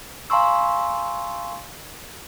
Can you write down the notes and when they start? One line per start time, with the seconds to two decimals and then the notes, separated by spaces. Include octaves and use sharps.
0.30 F5 G#5 A#5 C6 C#6 E6